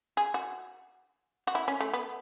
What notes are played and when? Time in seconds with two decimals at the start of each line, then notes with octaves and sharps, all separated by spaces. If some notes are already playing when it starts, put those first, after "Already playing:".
0.17 G#4
0.34 F#4
1.47 F#4
1.55 E4
1.68 C#4
1.81 A3
1.93 B3